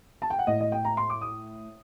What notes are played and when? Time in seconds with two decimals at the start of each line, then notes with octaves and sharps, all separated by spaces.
0.22 A5
0.30 G5
0.39 F#5
0.47 A2 D#5
0.61 D#5
0.72 G5
0.85 A#5
0.97 C6
1.10 D6
1.21 D#6